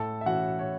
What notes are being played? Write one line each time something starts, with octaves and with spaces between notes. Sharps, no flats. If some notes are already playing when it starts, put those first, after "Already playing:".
Already playing: A2 A4 A5
E5
E3 C#4 F#4 F#5
C#5